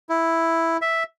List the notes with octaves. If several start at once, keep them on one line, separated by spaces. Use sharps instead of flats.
E4
E5